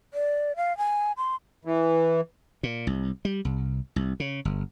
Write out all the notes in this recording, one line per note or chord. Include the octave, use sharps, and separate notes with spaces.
D5
F5
G#5
C6
E3
A#2
C2
G3
C2
C2
C#3
G1